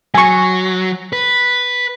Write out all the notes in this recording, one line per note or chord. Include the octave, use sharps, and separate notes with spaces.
F#3 G#5 C#6
B4